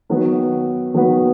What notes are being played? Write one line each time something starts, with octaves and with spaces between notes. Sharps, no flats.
D#3 F#3 B3 F#4 B4
D#3 F#3 B3 F#4 B4